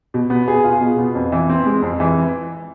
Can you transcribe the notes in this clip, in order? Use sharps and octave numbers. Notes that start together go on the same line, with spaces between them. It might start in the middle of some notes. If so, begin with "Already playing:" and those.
B2
B3
G#4
F4
B2
B3
F2
E3
C4
G#3
F2
E3